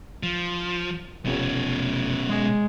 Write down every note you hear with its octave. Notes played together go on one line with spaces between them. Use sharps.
F3
F1 B2 C#4
G#3